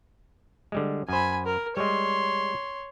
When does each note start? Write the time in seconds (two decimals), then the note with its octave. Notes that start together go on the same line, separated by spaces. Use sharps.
0.72 D3 G3 G#3
1.09 F#2 C5 G#5 B5
1.46 A#4
1.77 G3 G#3 C#5 C6